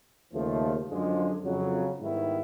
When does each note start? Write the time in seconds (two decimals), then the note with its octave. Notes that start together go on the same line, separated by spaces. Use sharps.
0.33 D#2 C#3 F3 A3
0.89 F#2 D3 F3 G#3
1.44 F2 C#3 F#3
1.99 G#2 D#3 G3 B3 E4